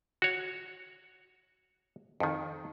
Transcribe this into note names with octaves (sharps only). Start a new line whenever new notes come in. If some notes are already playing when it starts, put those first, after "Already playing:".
F#4 C#5
F2 D#3